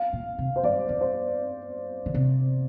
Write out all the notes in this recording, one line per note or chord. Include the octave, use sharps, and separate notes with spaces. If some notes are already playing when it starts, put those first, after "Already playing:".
Already playing: F5
A#2
C3
C5
G2 D5
F2
C5
D3
C3